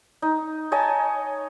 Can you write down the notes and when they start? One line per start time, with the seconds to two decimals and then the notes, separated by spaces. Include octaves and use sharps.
0.22 D#4
0.72 C#5 D#5 G#5 A5